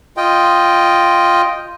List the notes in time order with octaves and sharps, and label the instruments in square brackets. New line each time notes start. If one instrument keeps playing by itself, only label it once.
[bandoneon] F4 D#5 G5